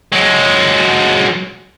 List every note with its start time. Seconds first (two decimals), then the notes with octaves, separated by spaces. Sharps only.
0.13 F#3 G#3